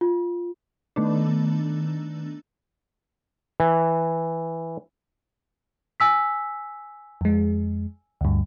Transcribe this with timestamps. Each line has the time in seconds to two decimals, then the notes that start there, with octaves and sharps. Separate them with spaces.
0.01 F4
0.96 D#3 A3 B3 D4
3.60 E3
6.00 G#5 E6 B6
7.21 F2 G#3
8.21 D2 G2